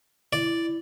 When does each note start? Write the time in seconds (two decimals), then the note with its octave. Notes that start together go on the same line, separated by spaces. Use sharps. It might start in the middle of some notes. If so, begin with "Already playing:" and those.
0.33 E4 D5